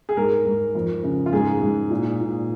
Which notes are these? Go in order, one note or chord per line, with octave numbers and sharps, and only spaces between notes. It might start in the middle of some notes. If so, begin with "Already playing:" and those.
G#4
G#2 A#4
G#2
F2
C#3
F4
G#2 G#4
G#2
A#2
A#2